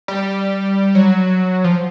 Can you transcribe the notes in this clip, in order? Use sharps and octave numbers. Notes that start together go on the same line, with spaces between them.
G3
F#3
F3